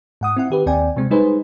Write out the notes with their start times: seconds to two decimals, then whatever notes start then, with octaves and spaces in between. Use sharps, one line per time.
0.21 G#2 F#5 D#6
0.37 C4 E4 F#5
0.50 D#3 G4 B4
0.66 D#2 C4 D5 G5 G#5
0.96 C3 G#3 C4
1.10 G3 G#3 D#4 G#4 B4 C5